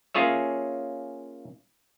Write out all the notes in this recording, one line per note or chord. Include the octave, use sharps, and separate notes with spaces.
A#3 C#4 F4 G#4 C#5 E5